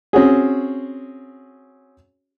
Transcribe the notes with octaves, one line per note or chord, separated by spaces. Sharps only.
C4 C#4 F#4 G#4